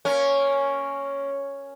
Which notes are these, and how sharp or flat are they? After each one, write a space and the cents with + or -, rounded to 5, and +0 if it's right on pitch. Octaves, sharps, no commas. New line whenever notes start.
A#3 -5 C#4 +0